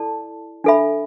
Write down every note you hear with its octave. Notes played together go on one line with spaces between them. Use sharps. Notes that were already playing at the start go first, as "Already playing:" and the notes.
Already playing: E4 A4 D5 A5
D4 A4 E5 B5